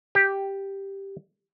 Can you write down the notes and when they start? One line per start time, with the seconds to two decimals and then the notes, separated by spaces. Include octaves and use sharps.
0.15 G4